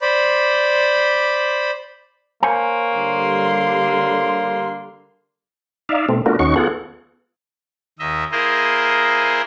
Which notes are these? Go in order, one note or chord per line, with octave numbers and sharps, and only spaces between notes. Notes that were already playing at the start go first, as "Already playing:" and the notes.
C5 D5 B5
A#3 C5 C#5 G#5
D3 G3 C6
D#4 D5 E5 F5
B2 A3 C4
A3 B3 D4 F4 F#4 A#4
D#2 C#4 D#4 F#4 C#6
B3 F4 G#4 A4 F#5
D#2 D#5 E5
A#3 E4 G#4 A#4 C5 D#5